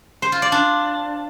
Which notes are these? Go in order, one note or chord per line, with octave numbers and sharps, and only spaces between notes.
C5
F4
D5
D4